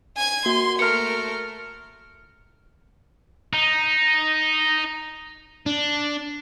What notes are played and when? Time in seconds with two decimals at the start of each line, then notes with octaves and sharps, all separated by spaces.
0.17 G#5 G#6
0.46 A#3 F#4 C6
0.79 A3 A#4 F6 C#7
3.53 D#4
5.66 D4